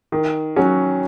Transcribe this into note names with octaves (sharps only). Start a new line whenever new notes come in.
D#3
F#3 C#4 F#4